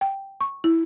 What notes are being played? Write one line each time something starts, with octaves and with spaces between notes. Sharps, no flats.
G5
C#6
E4